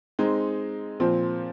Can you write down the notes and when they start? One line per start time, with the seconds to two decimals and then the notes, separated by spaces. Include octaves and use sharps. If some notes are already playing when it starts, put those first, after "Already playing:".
0.19 G#3 C4 D#4
1.00 A#2 F3 C4